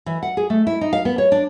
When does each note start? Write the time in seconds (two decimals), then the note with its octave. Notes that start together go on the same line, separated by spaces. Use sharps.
0.06 E3
0.23 F#5
0.37 G#4
0.50 A3
0.67 E4
0.81 D#4
0.93 F5
1.05 B3
1.18 C#5
1.32 D4